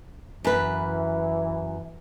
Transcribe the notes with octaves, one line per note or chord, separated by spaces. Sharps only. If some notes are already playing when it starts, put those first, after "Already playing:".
F#2 E3 B4